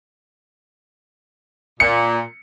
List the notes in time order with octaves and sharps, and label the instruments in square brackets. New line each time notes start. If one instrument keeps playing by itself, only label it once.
[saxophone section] A#2 [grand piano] C#7